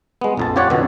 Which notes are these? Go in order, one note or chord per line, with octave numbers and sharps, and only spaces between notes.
G#3 B3
A#1 F2 A5
F4 G4 C#5 D5 F#5
F2 B2 D3